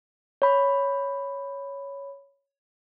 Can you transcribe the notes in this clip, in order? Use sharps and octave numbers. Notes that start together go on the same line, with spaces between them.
C#5 B5